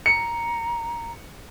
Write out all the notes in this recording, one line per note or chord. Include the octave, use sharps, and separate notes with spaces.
A#5 C#7